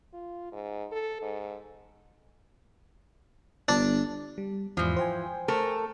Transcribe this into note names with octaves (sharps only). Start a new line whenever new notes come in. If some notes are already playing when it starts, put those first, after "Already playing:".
F4
G#2
A4
G#2
G1 D4
G3
E2 G#2 E3 F3
C5 G5 G#5
A3 A4 A#4